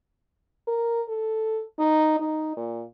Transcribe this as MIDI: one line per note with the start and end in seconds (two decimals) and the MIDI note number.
0.68 1.03 70
1.09 1.63 69
1.79 2.18 63
2.20 2.55 63
2.57 2.83 46